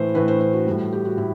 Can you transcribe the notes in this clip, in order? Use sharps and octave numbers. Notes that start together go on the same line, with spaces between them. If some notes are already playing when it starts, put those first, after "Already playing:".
Already playing: A2 E3 A3 B4 C5
A2 E3 A3 B4
C5
C5
F#4
A2 G3
G4
F#4
A2 E4